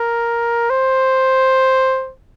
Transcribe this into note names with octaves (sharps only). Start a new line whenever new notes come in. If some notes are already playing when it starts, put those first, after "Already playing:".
Already playing: A#4
C5